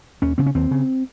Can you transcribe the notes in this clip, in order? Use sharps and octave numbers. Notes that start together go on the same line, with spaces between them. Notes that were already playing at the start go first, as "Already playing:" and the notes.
D#2 C#4
C#3 C4
C#4
D#2 C4
C#3